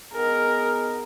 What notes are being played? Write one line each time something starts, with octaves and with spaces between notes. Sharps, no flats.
B3 D#4 G#4 A#4